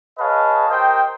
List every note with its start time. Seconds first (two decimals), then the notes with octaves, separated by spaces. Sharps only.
0.19 G#4 B4 C#5 D#5 F5 A5
0.68 G4 A#4 C5 D#5 G5